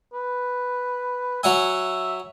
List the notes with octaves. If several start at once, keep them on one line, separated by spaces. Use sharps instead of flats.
B4
F#3 E5 F#5 G#5